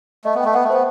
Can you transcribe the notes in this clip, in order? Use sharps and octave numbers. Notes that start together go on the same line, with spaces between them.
A3 D#5
B3
A3 G5
B3 F#5
A3
B3 C5